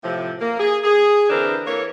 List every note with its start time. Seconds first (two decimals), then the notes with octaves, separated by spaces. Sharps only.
0.04 A2 C3 F3
0.41 A#3
0.60 G#4
0.84 G#4
1.30 D3 E3 C4 D4 A#4 C5
1.66 E3 A#3 A4 C#5